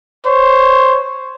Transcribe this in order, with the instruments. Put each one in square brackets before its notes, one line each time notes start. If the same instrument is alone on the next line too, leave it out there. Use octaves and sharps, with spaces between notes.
[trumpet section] C5 C#5